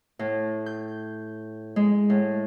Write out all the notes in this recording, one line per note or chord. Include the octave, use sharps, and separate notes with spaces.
A2
G6
G#3
A2